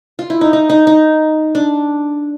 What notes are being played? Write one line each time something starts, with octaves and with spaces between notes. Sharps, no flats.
F4
E4
D#4
D#4
D#4
D#4
D4